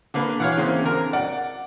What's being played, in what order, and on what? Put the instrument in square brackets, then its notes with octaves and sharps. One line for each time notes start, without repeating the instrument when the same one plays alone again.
[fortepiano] D3 A#3 B4
[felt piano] E3 [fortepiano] C#5 F5 F#5
[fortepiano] C#3 A#3 C4
D3 C4 A#4
[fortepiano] D5 [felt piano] F#5